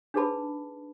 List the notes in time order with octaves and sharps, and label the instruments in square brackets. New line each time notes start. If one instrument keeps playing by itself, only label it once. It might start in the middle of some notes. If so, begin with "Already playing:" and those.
[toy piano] D4 D#4 G#4 B4 A5 B5